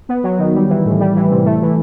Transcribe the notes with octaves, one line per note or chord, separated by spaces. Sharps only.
B3
F#3
D#3
G3
E3
A2
G3
E3
C3
A3
E3